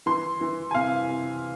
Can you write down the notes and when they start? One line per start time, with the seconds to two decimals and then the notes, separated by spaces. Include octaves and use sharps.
0.06 E3 C6
0.41 E3
0.71 G#5
0.74 C3 F5
1.09 C3